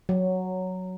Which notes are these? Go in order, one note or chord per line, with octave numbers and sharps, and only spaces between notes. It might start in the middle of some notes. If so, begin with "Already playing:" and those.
F#3